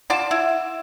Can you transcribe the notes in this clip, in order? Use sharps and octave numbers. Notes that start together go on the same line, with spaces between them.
F4 D5 F#5 A5 E7
E4